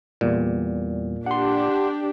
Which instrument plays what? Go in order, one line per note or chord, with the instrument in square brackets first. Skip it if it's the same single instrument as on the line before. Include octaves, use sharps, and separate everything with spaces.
[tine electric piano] E2 G3 [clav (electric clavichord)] A#2
[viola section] D4 G4 [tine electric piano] F#5 C6